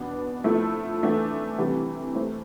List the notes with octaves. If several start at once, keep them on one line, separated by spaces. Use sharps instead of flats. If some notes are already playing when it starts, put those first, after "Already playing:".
Already playing: E2 B2 B3 D4
F3 A3 E4 A4
E3 A3 D4 A4
C3 E3 G3
A3 C4 E4